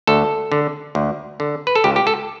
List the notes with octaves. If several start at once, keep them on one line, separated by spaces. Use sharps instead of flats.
D2 A4
D3
D2
D3
B4
A4
C#2 G4
G4
A4